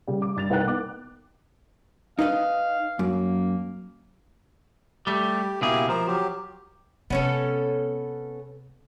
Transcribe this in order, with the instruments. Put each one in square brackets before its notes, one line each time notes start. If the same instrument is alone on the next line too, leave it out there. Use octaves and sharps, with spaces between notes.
[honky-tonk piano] C#3 G3
D6
G2 A6 F7
C2 D#4 B4 F#5 G5 F#6
B3 D6
[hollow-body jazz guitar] D#4 B4 D#5 [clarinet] F5
[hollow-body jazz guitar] F#2 [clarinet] A#3
[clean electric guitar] G3 A3 [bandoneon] G4
[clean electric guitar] C#2 B2 G#4 [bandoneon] A#3 E4 G4
[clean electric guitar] F3 [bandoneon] A#4 C5
[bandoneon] F#3 G4
[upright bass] C3 G#3 [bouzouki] B3 C#4 A4